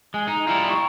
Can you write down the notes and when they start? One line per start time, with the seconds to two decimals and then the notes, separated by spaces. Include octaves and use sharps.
0.14 G#3 G#5
0.28 D#4 A#5
0.47 G3 E4 F4
0.70 C#6